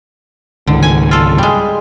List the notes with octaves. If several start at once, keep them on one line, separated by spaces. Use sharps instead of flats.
C#2 G#2 D3 D#3
G#5
F4 A4
G3 G#3